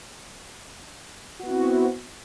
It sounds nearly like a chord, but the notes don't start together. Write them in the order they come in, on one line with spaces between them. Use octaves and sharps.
F#4 B3 E4 C4